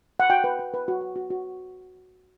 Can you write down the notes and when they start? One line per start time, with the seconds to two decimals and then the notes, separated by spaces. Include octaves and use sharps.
0.20 F#5
0.30 F#4 G5
0.44 B4
0.59 B4
0.74 B4
0.88 F#4
1.01 B4
1.16 F#4
1.30 F#4